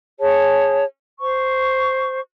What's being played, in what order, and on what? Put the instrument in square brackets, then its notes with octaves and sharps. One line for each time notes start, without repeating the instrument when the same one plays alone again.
[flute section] G#4 C#5 A5
C5 C#6